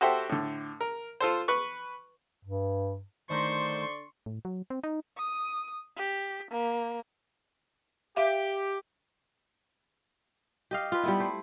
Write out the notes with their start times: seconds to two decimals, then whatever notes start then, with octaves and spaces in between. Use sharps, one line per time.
0.01 F#4 G4 A4 C5 E5 G5
0.29 A2 D3
0.81 A#4
1.20 F4 A4 C5
1.48 B4 C#6
2.45 G2
3.30 D3 D#3 A3 A#4 C5 D5 C6 C#6
4.26 A2
4.45 F#3
4.70 C4
4.84 D#4
5.17 D#6
5.97 G4
6.51 A#3
8.16 G4 E5 F5
10.71 G4 D#5 F5
10.92 F4 B4
11.03 G3 B3 E4
11.20 A3 C5